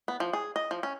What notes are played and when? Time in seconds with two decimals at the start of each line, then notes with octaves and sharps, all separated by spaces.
0.08 B3
0.20 F3
0.33 G#4
0.56 D#5
0.71 F3
0.83 C#4